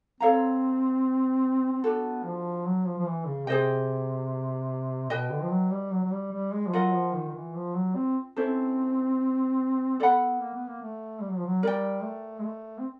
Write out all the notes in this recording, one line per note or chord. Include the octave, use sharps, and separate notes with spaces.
C4 A4 C#5 F5 A#5
C4
B3 D4 F#4 A4
F3
F#3
F3
F3
E3
C#3
C3 G#4 C5 D#5 G5
B2 B4 D#5 G5
D3
F3
F#3
G3
F#3
F#3
G3
G3
G#3
F3
F#3 F4 A#4 D#5 F#5
F3
D#3
D#3
E3
F3
F#3
C4
C4 C#4 E4 A4 C5
B3 A4 D5 F#5 B5
A#3
B3
A#3
A3
G3
F#3
F3
F#3
G3 A#4 D5 G5
A3
G#3
A3
C4